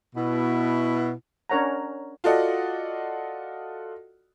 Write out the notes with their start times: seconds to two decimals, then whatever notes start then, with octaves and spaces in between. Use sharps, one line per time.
0.16 B2 E4
1.50 C#4 D4 A#4 C#5 F#5 A#5
2.24 F4 F#4 A4 D5 D#5 F#5